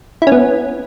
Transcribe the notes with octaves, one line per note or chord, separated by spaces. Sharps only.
E4
C#4
B3